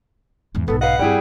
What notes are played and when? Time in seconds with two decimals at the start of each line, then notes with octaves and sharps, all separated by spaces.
0.55 E2 G#2
0.68 B1 G#2 B3 A4
0.81 B4 D#5 F5 F#5
0.99 G2 G3 C4 E4 G#4 G5